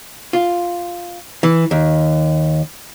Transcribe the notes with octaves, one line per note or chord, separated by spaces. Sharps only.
F4
E3
D#2